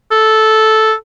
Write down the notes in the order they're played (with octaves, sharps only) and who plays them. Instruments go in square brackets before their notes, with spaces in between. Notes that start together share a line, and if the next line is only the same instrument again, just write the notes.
[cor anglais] A4